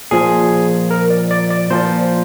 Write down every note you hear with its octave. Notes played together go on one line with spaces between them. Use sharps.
A#2 F3 G#4
A#4
D5
D5
D5
A#2 F3 C5